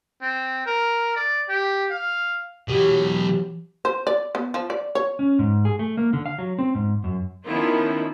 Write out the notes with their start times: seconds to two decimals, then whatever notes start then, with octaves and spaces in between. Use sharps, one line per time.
0.22 C4
0.66 A#4
1.16 D5
1.49 G4
1.90 F5
2.68 B2 E3 F#3 G4
3.85 C5
4.07 D5
4.35 B3
4.54 F3
4.70 D5
4.95 C#5
5.19 C#4
5.39 G#2
5.65 G#4
5.79 A3
5.97 A#3
6.13 D3
6.26 F5
6.38 F#3
6.59 C4
6.75 G#2
7.04 F#2
7.46 D#3 F3 B3 C#4 E4 F4